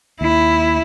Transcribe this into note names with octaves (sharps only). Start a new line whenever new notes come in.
D#2 E4